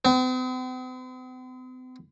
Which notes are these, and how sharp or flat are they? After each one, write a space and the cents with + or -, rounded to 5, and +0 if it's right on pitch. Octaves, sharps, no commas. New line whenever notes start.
C4 -45